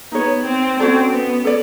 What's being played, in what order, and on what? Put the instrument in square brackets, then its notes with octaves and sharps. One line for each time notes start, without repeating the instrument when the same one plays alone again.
[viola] B3 [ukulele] D#4 G#4 C#5
[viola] C4
[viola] C4 [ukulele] C#4 F#4 A4 D5
[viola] B3
[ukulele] A4 D5